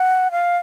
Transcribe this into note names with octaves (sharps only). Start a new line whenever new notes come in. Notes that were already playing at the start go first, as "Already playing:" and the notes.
Already playing: F#5
F5